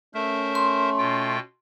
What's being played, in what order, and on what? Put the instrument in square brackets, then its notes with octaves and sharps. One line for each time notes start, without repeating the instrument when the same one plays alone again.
[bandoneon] A3 [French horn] C#4 [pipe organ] A#4 C5 E5
[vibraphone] C6
[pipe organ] B2 F4 G5